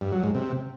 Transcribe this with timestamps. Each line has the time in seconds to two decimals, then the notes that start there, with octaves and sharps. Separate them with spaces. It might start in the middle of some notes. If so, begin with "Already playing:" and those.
0.01 G2
0.12 F#3
0.23 G#2
0.35 C3